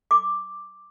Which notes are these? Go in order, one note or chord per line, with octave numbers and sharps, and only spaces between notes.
D6